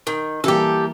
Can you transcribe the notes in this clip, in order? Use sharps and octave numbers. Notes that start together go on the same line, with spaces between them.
D#3
E3 G3 A#3 G4 A4